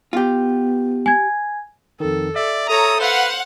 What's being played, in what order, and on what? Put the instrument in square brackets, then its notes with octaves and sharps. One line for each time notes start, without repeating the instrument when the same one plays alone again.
[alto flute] B3 [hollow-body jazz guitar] F4 G4
[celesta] G#5 G#6
[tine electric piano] F2 D#3 [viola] A4
[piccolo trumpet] D5 [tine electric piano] E5
[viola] A4 C#5 [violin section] A#5 [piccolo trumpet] D#6
[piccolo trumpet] B4 [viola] C5 [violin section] F5 F#5